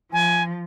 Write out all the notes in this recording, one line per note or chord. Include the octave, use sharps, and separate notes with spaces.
F3 G#5